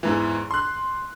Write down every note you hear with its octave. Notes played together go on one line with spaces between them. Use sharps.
E2 G#2 E3
C6 F#6